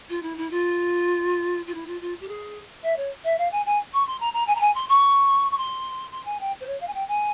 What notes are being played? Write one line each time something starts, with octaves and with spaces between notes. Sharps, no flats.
F4
E4
E4
F4
F4
E4
F4
F4
G4
G#4
E5
C#5
E5
F5
G#5
G#5
C#6
C6
A#5
A#5
G#5
A#5
G#5
C6
C#6
C#6
C6
C6
G#5
G5
C5
C#5
F5
G#5
G5
G#5